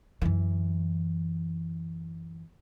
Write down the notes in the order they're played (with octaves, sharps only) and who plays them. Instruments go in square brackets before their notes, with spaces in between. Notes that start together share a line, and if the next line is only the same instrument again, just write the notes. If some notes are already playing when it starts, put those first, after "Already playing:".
[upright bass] F#2 E3